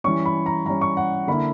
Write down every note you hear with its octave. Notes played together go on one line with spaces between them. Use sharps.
E3 G3 C#4 C#6
B5
A#5
E3 G3 C#4 A#5
C#6
F#5
D3 A#3 E4 B5